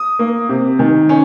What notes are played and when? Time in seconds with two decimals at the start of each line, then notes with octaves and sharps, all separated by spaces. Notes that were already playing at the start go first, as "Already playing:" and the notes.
Already playing: D#6
0.19 A#3
0.49 C3
0.79 D#3
1.09 C#4